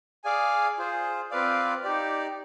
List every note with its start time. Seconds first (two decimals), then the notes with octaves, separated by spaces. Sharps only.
0.24 G#4 D5 F5 G#5
0.78 F4 G#4 C5
1.31 C4 F4 B4 D5 F5
1.83 D#4 G4 D5